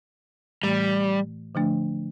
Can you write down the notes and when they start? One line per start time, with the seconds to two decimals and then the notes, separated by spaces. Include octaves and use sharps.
0.63 A2 E3 G3 A3
1.55 D3 F3 A3 D4